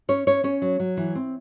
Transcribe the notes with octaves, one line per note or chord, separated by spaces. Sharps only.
C#4 C#5
C#4 C#5
C#4 C#5
F#3
F#3
E3
C4